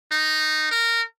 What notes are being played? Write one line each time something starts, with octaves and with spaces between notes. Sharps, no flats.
D#4
A#4